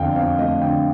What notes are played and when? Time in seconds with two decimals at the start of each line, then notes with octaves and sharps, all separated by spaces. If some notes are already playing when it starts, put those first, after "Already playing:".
Already playing: F2 D3 F5 G5
0.16 F2 F5
0.39 A3 D#5
0.61 D3 G5